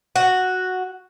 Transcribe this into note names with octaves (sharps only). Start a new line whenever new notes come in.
F#4